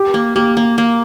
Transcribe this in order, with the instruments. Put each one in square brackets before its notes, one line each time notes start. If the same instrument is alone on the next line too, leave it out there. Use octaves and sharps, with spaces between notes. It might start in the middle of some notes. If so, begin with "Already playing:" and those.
Already playing: [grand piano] G4
[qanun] A#3
[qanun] A#3 [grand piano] G4
[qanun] A#3
A#3